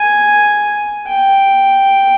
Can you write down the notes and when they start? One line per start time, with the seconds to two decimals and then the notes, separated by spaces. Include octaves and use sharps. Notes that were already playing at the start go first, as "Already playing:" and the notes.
Already playing: G#5
1.07 G5